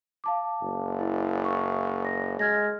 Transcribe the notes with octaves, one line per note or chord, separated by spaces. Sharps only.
F5 A5 D6
F#1
E4
C#6
A#6
G#3 F6 G#6 A#6